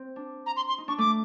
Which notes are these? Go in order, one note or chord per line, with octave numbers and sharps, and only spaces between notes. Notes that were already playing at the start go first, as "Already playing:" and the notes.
Already playing: C4
D4
A#5
C6
C6
D#4
D4 C#6
A3 D6